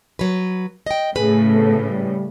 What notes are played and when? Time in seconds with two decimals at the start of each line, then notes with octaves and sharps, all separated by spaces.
0.19 F#3 B4
0.86 D#5 G5
1.16 A2 C#3 G#4 B4
1.51 C3 B3 A4
1.87 G3